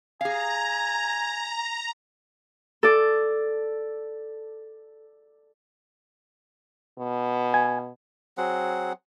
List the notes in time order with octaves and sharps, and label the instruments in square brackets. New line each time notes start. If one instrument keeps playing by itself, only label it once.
[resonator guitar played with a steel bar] G#4 F5 [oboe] G#5 [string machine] A#5
[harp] A4 D5
[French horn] B2
[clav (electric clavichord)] G#5
[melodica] F#3 C4 G#4 F#5